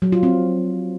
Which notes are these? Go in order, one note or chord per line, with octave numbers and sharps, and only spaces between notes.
F#3
F4
C4